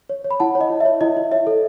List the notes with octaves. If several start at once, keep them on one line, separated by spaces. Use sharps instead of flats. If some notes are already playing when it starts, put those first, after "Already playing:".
C#5
C#5
B5
E4 F#5 A5
C#5
D#5
E4
C#5 E5
E4 D#5
E4
C#5 E5
A4